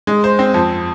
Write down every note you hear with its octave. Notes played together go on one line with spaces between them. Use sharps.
G#3
C5
C4
F2